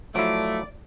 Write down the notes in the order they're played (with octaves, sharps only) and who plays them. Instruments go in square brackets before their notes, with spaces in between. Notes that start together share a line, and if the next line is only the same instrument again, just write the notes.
[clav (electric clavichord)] F3 F#3 E4 [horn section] A3 [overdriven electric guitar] D5